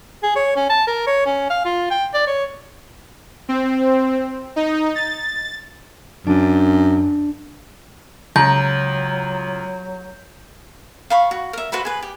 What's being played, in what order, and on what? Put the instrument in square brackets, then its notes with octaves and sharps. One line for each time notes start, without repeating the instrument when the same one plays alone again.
[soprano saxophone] G#4
C#5
C#4
A5
A#4
C#5
C#4
F5
F4
G5
D5
C#5
[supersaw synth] C4
D#4
A6
[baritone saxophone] F#2 [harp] D4
[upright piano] C#2 [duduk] F#3 [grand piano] A#5 [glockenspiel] G6
[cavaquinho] F5 B5 C#6
F#4
A#4 E5
F#4 B4 C5 B5
G#4 B4
G4